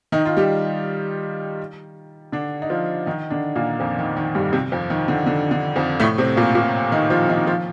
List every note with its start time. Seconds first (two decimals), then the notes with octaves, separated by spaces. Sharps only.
0.12 D#3 D#4
0.26 F4
0.37 G3 G4
2.32 D3 D4
2.62 D#4
2.70 F3 F4
3.06 D#3 D#4
3.30 D3 D4
3.55 A#2 A#3
3.80 F2 F3
3.98 D#3
4.16 D#3
4.35 G2 G3
4.53 C3 C4
4.72 F2 F3
4.90 D#3
5.08 D3
5.26 D3
5.51 D3
5.76 F2 F3
6.00 A2 A3
6.18 C3 C4
6.36 A#2 A#3
6.55 A#2 A#3
6.92 D#3 D#4
7.10 F3 F4
7.29 D#3 D#4
7.47 F3 F4